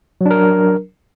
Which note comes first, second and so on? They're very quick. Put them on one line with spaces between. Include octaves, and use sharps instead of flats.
F#3 D4 A#4